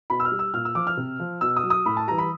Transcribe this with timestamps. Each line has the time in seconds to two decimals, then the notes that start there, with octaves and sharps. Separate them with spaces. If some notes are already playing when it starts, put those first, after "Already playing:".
0.10 B2 B5
0.20 E6
0.25 F6
0.32 G3
0.39 E6
0.54 A#2 F6
0.65 E6
0.75 F3 D6
0.87 F6
0.97 C3
1.20 F3
1.41 B2 E6
1.57 D#6
1.63 F#3
1.70 D#6
1.86 A2 B5
1.97 A5
2.08 E3 G3 A#5
2.18 B5